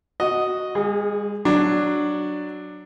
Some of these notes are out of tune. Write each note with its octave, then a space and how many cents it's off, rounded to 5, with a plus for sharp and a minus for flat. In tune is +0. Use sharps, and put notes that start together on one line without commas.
F#4 +0 D#5 +0
G#3 -45 G#4 +0
F#3 +5 D4 +10